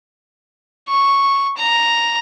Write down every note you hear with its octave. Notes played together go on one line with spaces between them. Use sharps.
C#6
A#5